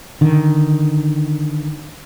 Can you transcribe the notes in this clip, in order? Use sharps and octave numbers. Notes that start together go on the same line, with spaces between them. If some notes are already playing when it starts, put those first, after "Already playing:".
D3 D#3